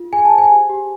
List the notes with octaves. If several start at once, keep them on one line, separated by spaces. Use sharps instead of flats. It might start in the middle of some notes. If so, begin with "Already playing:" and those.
Already playing: F4
G#4 G#5
A5
C5
G#5
G4
G4